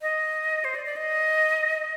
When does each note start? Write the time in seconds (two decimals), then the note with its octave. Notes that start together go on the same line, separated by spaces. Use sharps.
0.02 D#5
0.64 C5
0.75 D5
0.85 D5
0.96 D#5